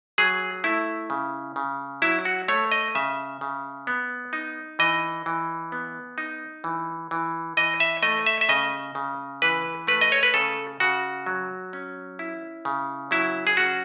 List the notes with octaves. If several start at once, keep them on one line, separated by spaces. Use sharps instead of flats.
F#3 G#4
A3 E4
C#3
C#3
F#3 E4
F#4
A3 C#5
D#5
C#3 E5
C#3
B3
D#4
E3 D#5
E3
B3
D#4
E3
E3
E3 D#5
E5
A3 D#5
E5
E5
C#3 D#5
C#3
E3 B4
A3 B4
D#5
C#5
B4
C#3 A4
C#3 F#4
F#3
C#4
E4
C#3
F#3 E4
G#4
C#4 F#4